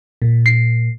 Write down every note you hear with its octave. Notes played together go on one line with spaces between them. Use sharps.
A#2
C7